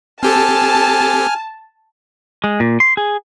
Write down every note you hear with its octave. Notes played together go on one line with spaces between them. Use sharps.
C4 G4 A4 G#5 A5 F6
G#3
A#2
C6
G#4